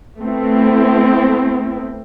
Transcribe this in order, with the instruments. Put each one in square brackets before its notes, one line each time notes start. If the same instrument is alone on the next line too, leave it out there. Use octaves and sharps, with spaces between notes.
[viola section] A3 B3 C4 E4